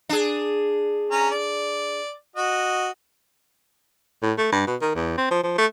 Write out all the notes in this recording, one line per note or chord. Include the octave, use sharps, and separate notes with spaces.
D4 G#4
C#4 A#5
D5
F#4 D#5
A2
A3
G2
B2
D#3
E2
C4
F3
F3
A3